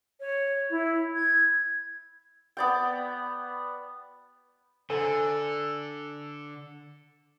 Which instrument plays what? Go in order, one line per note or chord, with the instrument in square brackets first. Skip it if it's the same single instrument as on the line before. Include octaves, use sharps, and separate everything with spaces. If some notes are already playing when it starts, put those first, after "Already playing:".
[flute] C#5
E4
G#6
[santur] B3 D5 G5
[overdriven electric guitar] D3 [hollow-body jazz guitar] A4 C5 G#5